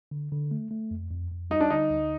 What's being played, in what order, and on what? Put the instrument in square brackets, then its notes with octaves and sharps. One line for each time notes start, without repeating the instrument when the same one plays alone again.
[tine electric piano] D3
D3
A3
A3
F2
F2
F2
[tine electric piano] G3 [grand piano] D#4
[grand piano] D4
[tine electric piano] D3 [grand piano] D#4
[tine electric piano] D2